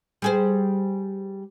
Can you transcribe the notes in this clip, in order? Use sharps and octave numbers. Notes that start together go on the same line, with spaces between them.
G3 G#4 C5